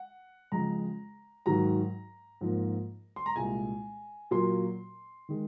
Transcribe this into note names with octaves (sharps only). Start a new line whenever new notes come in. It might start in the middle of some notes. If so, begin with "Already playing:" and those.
Already playing: F#5
F2 C#3 G#3 A#5
G#2 D#3 F#3 A#5
G#2 F3 A#3
C6
A#5
C2 A#2 G#3 G#5
A#2 F#3 A#3 C6
D#3 G#3